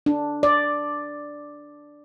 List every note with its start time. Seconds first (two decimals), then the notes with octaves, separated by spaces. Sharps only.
0.06 D4
0.43 D5